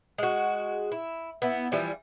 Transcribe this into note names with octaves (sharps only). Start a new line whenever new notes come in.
G#3 F#4
E4
B3 E4
E3 F3 G3